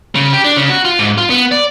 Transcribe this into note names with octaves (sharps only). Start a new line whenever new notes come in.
C#3
G4
D4
C#3
F#4
F4
G#2
F4
B3
D5